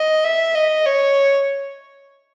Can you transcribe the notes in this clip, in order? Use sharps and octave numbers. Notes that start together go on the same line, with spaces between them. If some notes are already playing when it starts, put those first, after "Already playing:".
Already playing: D#5
E5
D#5
C#5